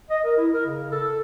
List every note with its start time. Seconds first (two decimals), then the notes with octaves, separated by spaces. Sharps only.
0.09 D#5
0.24 A#4
0.38 E4
0.53 A#4
0.65 C#3
0.91 A4